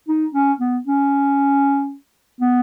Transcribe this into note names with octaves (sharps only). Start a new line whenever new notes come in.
D#4
C#4
B3
C#4
B3